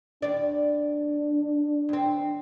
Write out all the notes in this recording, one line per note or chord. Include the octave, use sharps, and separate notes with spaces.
D#2 D4 D5
D#2 C4